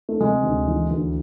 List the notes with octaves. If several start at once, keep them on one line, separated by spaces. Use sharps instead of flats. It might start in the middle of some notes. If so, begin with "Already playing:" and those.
A3
C3 G#3
D2
E3
D2